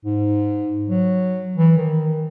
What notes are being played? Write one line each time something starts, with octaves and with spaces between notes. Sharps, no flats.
G#2
F#3
E3
D#3